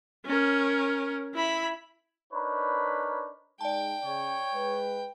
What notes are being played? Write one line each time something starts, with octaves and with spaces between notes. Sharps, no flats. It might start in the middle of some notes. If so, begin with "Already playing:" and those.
C#4 A#4
E4 B5
D4 D#4 A#4 B4 C#5 B5
G#3 D#4 D5 G5 A5
C#3 C#5
G#3 B4